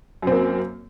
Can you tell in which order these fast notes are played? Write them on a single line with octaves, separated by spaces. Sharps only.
F#2 C4 A#3